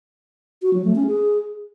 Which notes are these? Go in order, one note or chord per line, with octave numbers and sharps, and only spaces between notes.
F#4
F#3
A3
C#4
G#4